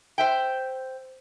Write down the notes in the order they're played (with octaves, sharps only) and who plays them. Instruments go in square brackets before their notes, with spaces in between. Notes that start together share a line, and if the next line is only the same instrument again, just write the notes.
[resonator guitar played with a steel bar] C5 E5 G5